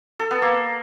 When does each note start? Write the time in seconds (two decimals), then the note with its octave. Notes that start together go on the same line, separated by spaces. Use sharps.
0.19 A4
0.31 B3
0.42 A#3